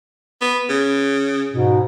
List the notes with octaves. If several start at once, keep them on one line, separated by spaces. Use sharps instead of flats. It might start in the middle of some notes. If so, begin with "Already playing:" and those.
B3
C#3
G#2 B2